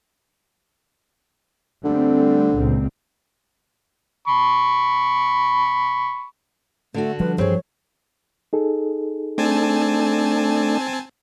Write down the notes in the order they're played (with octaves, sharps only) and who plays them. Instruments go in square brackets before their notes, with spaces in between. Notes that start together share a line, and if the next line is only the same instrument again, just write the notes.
[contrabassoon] D3 [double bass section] G3 A3 C4
[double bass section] C#2 A#2 C4
[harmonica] B5 C#6
[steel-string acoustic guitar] D3 D4 F#4 [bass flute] A3
[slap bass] F3 G3 [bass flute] B4
[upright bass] G2 E3 [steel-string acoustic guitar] C4 G#4 [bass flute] C#5
[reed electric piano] D#4 G#4 A4
[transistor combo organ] A3 D4 [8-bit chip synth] C4 G#5 A5